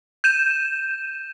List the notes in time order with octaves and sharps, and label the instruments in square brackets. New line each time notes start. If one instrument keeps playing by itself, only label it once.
[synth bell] G6 D#7 E7